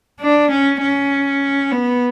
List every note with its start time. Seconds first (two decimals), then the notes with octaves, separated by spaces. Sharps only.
0.20 D4
0.50 C#4
0.80 C#4
1.72 B3